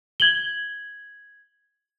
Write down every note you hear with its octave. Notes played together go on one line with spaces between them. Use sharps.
G#6 F#7 G7